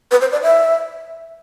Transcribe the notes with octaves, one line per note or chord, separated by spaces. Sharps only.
B4
C5
D5
E5